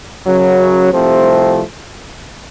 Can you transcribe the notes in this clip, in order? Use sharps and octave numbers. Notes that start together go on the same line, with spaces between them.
F#2 C#3 F#3
C2 C3 F3 A3 C4